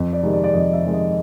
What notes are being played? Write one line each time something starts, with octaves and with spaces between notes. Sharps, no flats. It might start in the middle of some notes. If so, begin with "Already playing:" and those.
Already playing: F2
D5
C3 D#3 G#3
D5
D5
F2 D#5
E5
C3 D#3 G#3
D#5